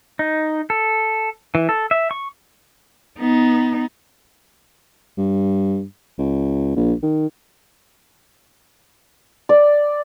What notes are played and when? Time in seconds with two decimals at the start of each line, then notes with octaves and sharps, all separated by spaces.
0.19 D#4
0.70 A4
1.55 E3
1.69 A4
1.91 E5
2.11 C#6
3.19 B3 D#4
5.18 G2
6.19 C#2
6.76 A#1
7.03 D#3
9.49 D5